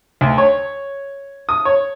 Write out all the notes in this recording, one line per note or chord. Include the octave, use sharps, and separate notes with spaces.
D2
C#5
D#6
C#5